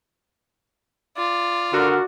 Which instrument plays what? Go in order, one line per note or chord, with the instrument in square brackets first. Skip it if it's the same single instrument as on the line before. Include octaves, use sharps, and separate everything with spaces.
[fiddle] F4 [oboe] D5
[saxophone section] D3 A#4 [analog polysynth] F#4 [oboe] D5